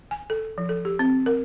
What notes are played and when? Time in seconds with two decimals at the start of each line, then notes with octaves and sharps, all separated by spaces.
0.11 G#5
0.30 A4
0.58 F3
0.69 A4
0.85 G4
0.99 C4
1.26 A#4